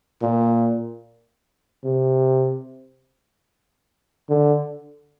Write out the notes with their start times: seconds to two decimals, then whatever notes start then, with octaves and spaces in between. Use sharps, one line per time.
0.22 A#2
1.84 C3
4.29 D3